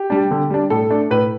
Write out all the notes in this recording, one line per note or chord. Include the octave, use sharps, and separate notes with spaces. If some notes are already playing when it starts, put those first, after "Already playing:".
Already playing: G4
G3 D4
D3
G3 D4
A2 A4
A3 D4
A2 B4